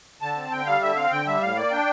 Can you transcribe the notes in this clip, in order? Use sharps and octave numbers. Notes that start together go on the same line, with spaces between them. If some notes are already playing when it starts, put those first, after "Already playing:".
D3 A5
C4
D3 G5
G3 F5
D3 E5
C4 F5
D3 G5
G3 E5
A2 F5
A#3 D5
D4 G5